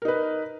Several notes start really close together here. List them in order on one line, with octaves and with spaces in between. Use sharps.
A#4 D#4 B4